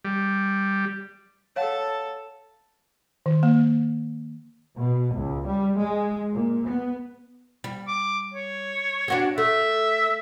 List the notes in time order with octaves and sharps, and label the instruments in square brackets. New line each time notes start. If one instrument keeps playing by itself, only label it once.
[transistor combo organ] G3
[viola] A4 A5 [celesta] C#5 F5 F#5
[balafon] D#3
A#3
[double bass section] B2
C#2
G3
G#3
A#2
B3
[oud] G3
[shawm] D6
C#5
[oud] D4 F#4 G4
[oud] A3 [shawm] E5